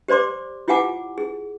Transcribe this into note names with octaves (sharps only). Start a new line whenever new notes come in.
G4 C5 D5 C6 D6
E4 F4 G4 F#5 G#5 D6
G#4